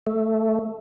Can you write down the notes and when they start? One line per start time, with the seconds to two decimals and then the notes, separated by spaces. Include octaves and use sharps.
0.07 A3